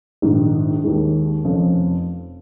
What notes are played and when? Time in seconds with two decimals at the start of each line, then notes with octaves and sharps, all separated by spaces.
0.22 A#1 G#2 D#3
0.84 D#2 D#3 G#3
1.45 F1 F2 F3 C#4